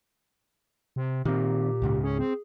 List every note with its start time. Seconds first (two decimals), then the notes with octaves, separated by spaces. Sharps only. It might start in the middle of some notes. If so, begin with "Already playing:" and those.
0.96 C3
1.25 A#2 D#3 C4 G4
1.82 C#2 G#2 C#3
2.03 C#4 G#4
2.19 C4